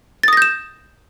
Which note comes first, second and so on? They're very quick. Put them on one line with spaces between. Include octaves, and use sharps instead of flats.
A6 D#6 A#6 G6 E7